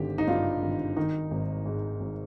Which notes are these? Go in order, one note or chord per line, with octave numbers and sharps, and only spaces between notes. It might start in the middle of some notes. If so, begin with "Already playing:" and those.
Already playing: G#1 D3 G4
D#4
G2 F4
G#1
D#3 D#4
G#1
G#2
G#1